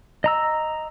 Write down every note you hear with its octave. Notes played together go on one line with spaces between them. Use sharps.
D#5 A#5 E6